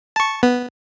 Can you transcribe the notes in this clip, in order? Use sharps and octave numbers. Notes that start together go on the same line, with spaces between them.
A5 C#6
B3